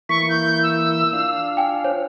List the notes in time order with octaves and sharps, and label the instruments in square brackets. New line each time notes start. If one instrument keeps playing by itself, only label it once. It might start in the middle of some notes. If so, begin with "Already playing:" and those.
[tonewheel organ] E3 A#3 E4 [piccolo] C#6 [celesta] B6
[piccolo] G6
E6
[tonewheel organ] D4 F4 F5
[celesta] G5 G#5
C5 C#5